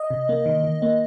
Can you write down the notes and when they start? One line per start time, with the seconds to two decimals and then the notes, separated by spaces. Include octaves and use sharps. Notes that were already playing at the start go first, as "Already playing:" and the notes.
Already playing: D#5
0.10 C3
0.29 A#3
0.46 D#3
0.64 D#3
0.82 A#3